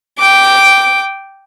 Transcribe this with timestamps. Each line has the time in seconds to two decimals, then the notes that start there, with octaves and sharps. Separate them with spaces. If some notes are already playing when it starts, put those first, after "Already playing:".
0.19 G5 D6